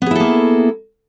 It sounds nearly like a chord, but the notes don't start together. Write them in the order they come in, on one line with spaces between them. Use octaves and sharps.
B3 G#4 E4 A4 A#3